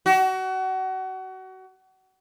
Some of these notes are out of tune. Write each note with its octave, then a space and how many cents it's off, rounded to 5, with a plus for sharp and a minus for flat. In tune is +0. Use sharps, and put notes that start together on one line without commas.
F#4 +30